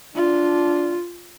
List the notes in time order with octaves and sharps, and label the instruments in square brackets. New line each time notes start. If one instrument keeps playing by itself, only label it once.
[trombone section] D4 [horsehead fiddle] F4